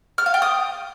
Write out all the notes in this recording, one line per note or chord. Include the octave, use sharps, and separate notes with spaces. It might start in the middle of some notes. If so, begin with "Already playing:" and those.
F6
F5
G5
D#6